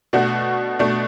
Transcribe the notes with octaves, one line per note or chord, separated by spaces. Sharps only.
B2 A3 D4 F#4
B2 A3 D4